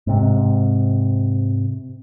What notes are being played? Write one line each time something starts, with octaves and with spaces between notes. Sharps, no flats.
G#2 C3